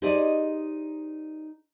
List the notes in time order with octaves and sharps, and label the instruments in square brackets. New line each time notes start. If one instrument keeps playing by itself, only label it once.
[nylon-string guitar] D#4 G4 G#4 C5 D5 D#5